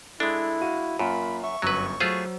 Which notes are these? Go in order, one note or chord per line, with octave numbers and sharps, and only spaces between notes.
G#3 D4 E4 A4
F#4 F5 D#7
F#2 A#3 F4 B5
E5 C#6
G1 F#2 F#3 B4 E6
F#3 A3 F4 G#4 C5